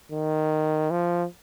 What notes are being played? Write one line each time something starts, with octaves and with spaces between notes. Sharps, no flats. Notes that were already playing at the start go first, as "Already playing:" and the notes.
D#3
F3